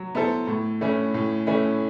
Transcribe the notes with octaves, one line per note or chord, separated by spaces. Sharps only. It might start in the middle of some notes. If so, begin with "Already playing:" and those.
Already playing: F#3
B3 E4 A4 C5
A2
E3 A3 C#4 E4
A2
E3 A3 C#4 E4